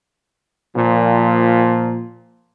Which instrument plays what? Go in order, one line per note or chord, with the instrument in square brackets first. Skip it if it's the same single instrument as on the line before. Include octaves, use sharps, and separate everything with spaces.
[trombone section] A#2 F3